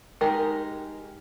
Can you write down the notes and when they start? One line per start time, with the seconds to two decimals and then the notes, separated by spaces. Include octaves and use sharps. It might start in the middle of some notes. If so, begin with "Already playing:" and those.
0.21 G#3 D#4 G4 G#4 A#4